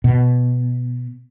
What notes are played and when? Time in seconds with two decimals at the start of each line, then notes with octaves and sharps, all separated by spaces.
0.04 B2